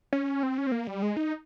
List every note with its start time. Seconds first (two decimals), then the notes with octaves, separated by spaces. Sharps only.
0.13 C#4
0.43 C4
0.58 C#4
0.67 C4
0.72 A#3
0.87 G3
1.02 G#3
1.17 D#4